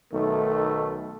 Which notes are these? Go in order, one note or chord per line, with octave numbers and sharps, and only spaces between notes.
B1 D#3 A3